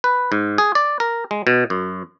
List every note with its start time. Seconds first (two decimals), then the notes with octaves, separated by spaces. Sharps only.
0.04 B4
0.32 G#2
0.58 G#4
0.75 D5
1.00 A#4
1.31 G#3
1.47 B2
1.70 F#2